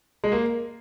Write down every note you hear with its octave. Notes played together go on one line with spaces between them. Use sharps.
G#3
A#3